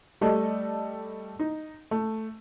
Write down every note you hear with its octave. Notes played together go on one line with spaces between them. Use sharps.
G3 A3 A4 D5 D#5
D#4
A3